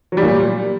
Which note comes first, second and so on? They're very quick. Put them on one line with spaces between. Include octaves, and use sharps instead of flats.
F#3 G3 A#2